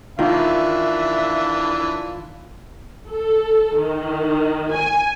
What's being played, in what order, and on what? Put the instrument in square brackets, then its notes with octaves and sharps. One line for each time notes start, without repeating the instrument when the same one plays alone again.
[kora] D#3 [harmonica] E3 D4 [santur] F4 [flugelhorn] E5
[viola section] A4
D#3
G#5